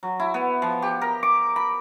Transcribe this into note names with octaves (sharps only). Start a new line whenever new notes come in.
F#3
E4
B3
F3
G4
A#4
D6
B5